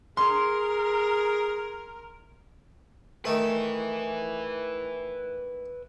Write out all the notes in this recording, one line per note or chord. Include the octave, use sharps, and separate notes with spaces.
G#4 A#4 C6
D#3 A3 B4 E5